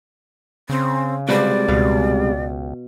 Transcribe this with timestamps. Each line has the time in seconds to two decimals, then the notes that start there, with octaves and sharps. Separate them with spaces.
0.69 C#3 C4
1.29 C3 G3 G#3 F#4 B4 C5 D5
1.68 C#2 B2 F5